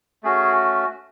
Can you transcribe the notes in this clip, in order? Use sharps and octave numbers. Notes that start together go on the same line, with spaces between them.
A3 C#4 F#4 G#4